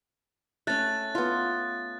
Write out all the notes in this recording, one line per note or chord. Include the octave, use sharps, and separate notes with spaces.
A3 C#4 F#6 A6
B3 F4